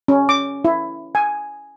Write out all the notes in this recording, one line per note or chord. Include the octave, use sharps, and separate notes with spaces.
C#4
D6
E4
G#5